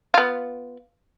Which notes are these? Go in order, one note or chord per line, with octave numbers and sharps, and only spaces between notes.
B3 F4